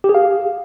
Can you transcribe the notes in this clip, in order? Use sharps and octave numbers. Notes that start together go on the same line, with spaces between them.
G4
G#4
F5